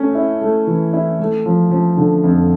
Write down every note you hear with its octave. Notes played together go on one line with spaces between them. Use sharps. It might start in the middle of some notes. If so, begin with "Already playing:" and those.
Already playing: A3 C#4
E4
A3
E3
E4
A3
F3
F3
D3
F2